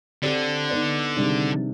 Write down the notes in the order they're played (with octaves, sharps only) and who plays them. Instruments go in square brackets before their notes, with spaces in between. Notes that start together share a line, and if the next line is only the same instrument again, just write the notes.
[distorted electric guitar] D3 [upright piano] C4 G4 D5
[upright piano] B3 D#4 B4 D5
C3 D#3 G3 D4 G#4